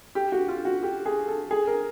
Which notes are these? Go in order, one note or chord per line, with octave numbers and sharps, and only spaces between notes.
G4
F#4
F4
F#4
G4
G#4
A4
G#4
A#4